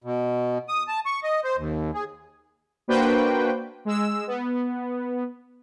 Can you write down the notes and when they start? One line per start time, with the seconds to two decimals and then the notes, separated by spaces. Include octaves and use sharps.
0.04 B2
0.69 D#6
0.88 A5
1.06 C#6
1.23 D#5
1.44 C5
1.57 D#2
1.94 G#4
2.88 A#3 D4 F#4 B4 C5 G5
3.85 G#3 E6
4.27 B3